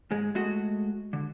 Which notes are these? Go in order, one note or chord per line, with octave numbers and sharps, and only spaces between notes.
G#2 G#3
G#3 A3 F#4 D#5
D3